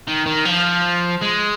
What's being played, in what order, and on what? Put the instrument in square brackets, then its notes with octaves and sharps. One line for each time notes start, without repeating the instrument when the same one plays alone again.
[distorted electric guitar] D#3
D#3
F3
G#3